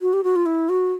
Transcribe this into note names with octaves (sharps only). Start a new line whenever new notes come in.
F#4
G4
F#4
F4
E4
F#4